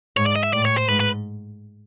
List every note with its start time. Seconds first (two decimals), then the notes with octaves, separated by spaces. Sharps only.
0.17 G#2 C#5
0.26 D5
0.36 D#5
0.43 E5
0.53 A2 D5
0.65 C#5
0.77 C5
0.88 G#2 B4
1.00 B4